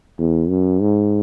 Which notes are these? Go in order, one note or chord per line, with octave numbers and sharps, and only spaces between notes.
E2
F#2
G#2